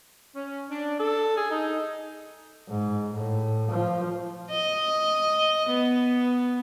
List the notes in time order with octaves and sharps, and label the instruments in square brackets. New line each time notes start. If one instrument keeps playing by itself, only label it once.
[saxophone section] C#4
D4
A4
G#4
D#4
[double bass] G#2
A2
F3
[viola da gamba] D#5
B3